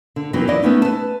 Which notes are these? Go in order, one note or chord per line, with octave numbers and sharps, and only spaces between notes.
D3
F#2 C3 E3 F#3 B3 D#4
E2 E3 D#4 D5 D#5
A3 B3 C#4 D#4
B4 A5